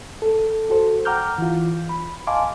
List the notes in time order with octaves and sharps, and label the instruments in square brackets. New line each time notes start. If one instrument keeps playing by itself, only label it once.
[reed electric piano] A4
F#4 A4 C5
F#5 G5 A#5 D6 F6 G6
E3 F4
B5
D#5 F5 G#5 A5 C6 D6